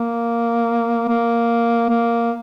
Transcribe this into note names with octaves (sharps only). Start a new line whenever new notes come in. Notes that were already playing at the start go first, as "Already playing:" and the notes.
Already playing: A#3
A#3
A#3